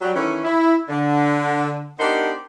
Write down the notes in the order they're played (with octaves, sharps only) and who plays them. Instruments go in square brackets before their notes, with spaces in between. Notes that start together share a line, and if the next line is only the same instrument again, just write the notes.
[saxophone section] F#3 G3
D#3 E3 A3 C#4
E4
D3
B3 D4 D#4 G4 A#4 C5